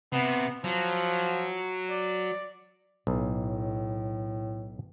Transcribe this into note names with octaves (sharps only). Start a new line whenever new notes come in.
C3 B3
F3 F#3
D5
B1 A2